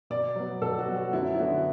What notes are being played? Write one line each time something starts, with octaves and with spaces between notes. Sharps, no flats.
B2 D5
F#3 B3
B2 A4
F#4
F#3 B3
F#4
F#2 E4
E4
D3 B3 F#4